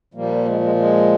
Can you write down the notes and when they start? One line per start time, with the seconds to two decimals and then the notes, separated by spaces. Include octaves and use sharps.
0.14 A#2 F3 G3 A#3
0.45 G#3
0.61 G#3
0.76 G#3